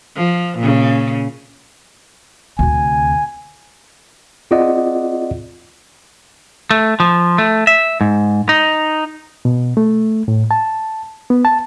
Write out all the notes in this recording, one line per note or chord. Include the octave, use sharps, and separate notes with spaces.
F3
A#2 C#3
D2 C3 G#5
C4 F4 G#4 D5 D#5 F#5
A3
F3
A3
E5
G#2
D#4
B2
A3
A2
A5
B3
A5